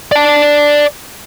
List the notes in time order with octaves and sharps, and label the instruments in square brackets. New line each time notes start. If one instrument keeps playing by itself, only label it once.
[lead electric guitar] D5 A5